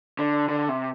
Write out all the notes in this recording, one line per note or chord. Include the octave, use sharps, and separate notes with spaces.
D3
D3
C3